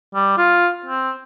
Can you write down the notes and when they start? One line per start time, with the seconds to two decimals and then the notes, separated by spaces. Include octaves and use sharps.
0.15 G3
0.38 F4
0.86 C4